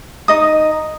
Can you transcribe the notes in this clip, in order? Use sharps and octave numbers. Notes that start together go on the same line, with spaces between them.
D#4 D#5 D#6